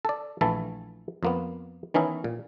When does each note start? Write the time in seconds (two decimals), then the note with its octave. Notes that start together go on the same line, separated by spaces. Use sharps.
0.05 A4 D5
0.41 A#1 E3 A3 E4 E5 A5
1.23 F2 A#3 B3
1.94 D#3 E3 B3 C#4 D#4 E4
2.24 A#2